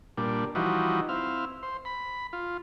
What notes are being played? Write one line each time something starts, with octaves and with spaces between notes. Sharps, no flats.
A#2 G3 D4
E3 F3 G3 D#4 F#4
C4 E4 F5
C5
B5
F4